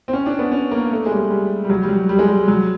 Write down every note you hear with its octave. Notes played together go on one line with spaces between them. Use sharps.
C4
C#4
D4
B3
C#4
A#3
A3
G#3
G3
G3
G3
F#3
G3
F#3
G3
G#3
G3
F#3